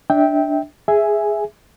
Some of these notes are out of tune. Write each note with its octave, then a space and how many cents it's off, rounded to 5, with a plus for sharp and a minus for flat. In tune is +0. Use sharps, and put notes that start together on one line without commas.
D4 +0 E5 -30 G5 +0
G#4 +0 E5 +0 G#5 +0